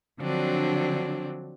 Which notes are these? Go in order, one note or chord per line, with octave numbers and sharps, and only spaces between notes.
D3 F3 F#3 C4 D4